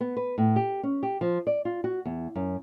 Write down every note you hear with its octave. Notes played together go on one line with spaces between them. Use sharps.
B3
B4
A2
G4
C#4
G4
F3
D5
F4
F#4
E2
F#2